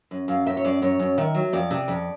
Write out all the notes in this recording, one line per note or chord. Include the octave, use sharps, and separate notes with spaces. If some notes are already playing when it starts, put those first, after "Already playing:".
F#2
F#2 F5
F#2 E5
C#5
F#2 D5
F#2 C#5
F#2
D#3 E5
F#3
F2 D5
C3
F2